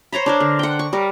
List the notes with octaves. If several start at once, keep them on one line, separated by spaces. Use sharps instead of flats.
C5 C#5 A#5 B5
D4 A#4 C5
D3
F#5 G5
C#6
G3 A#4